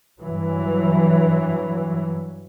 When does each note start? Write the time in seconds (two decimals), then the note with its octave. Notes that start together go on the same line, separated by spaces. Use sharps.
0.19 G2 E3 F#3